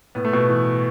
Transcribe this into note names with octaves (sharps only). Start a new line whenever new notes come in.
A2 B3
A3
B2 B3
E3